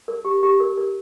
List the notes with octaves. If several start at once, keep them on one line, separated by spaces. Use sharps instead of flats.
A#4
G4
G4
A#4
A#4